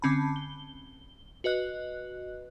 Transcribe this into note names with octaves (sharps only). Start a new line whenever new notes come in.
D3 C4 C#4 A5 B5
G7
F#4 B4 D#5 F#6